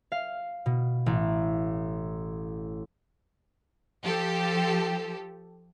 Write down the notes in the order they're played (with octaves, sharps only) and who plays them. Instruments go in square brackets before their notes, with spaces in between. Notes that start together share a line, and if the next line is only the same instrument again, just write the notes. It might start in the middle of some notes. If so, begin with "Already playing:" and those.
[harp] F5
B2
A1
[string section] F3 G4 A4